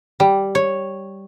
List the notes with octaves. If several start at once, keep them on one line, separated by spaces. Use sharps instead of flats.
G3
C#5